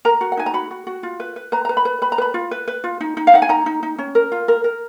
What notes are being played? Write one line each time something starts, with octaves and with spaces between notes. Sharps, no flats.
A#4 A#5
F#4
F#5
D#4 G#5
A#5
F#4 B5
F#4
F#4
F4
B4
B4
B4 A#5
B4 A#5
B5
B4
B4 B5
A#5
B4 B5
F4
B4
B4
F4
D#4
D#4
F5
D#4 F#5
G#5
D#4 A#5
D#4
D#4
C#4
A#4
F4
A#4
A#4